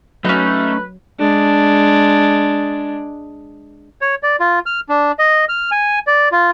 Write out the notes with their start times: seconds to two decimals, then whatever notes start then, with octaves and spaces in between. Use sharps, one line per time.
0.25 F#3 A3 C#4 D#4 B4
1.19 G#3 D4
4.01 C#5
4.23 D5
4.40 F4
4.66 F6
4.89 D4
5.19 D#5
5.49 F6
5.71 G#5
6.07 D5
6.32 F4